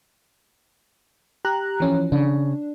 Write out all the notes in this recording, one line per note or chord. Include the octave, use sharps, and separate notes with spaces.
G4 A#5 F#6
E3 F3 C#4
C#3 D4